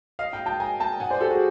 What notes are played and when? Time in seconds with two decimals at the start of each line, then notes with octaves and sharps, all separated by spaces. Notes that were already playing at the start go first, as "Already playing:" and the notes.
0.19 D#5 F5
0.33 F5 G5
0.46 G5 A5
0.60 G#5 A#5
0.80 G5 A5
1.00 F#5 G#5
1.10 C5 D5
1.21 G4 A4
1.30 F#4 G#4